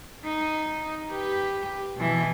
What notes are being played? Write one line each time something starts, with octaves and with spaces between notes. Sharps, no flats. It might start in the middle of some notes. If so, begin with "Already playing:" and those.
D#4
G4 B4
B2 E3